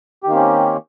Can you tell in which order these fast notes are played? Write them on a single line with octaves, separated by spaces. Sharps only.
G4 D#3 A#3 C4 C#4